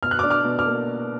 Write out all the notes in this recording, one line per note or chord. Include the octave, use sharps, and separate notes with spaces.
B2 F6
F#6
D6 F6
D4
D6 F6
B2
D6 F6
A#3